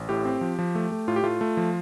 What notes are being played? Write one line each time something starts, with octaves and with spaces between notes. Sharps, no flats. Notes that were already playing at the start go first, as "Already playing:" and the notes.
Already playing: A1
A2 G4
C4
F3
F3
A3
A3
A2 F4
G4
A3 F4
A3
F3